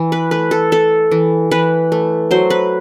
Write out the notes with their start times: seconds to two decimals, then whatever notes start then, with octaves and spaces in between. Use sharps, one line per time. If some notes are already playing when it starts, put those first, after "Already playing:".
Already playing: E3
0.12 B4
0.31 A3 B4
0.51 A4
0.72 A3 A4
1.11 E3
1.51 E3 B4
1.92 A3
2.31 F#3 C5
2.50 B4